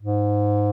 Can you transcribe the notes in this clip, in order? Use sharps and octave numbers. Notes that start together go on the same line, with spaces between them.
G#2